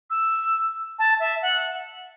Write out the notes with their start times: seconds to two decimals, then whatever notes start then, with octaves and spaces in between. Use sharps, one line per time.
0.10 E6
0.99 A5
1.20 E5
1.42 F#5